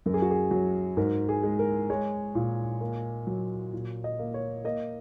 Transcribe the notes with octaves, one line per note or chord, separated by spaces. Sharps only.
F#2 A#4
G#4
F#4
G#4
F#3
G#2 A#4
G#4
G#3
A#4
G#3 C#5
A#2
A#3
F#3
A#2
D#5
A#3
C#5
A#3 D#5